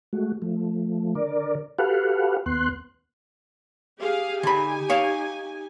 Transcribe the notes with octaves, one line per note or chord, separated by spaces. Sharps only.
G#3 A3 F#4
F3 A3
D3 A#4 D5
F#4 G4 A4 B4 F5 F#5
D#2 B3 C6 F#6
G4 G#4 F5
D3 D#4 G4 G#5 B5
C#5 F5